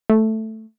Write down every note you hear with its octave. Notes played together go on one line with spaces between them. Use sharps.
A3